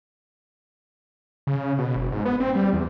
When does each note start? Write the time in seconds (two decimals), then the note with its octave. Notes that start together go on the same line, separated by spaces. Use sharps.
1.47 C#3
1.78 B2
1.96 F#1
2.12 G#2
2.25 B3
2.40 C4
2.55 G3
2.73 E2